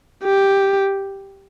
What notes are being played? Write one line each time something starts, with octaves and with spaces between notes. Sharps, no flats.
G4